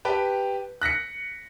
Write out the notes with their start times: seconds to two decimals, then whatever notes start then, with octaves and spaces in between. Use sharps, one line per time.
0.05 G4 B4 G5 A5
0.82 F#6 A#6 B6 C#7